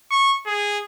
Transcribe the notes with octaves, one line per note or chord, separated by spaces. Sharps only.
C#6
G#4